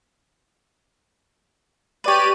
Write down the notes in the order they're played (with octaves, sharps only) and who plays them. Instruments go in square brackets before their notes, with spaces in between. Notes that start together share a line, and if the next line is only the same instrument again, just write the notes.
[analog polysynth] G4 D5 D#7 [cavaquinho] B4 C#5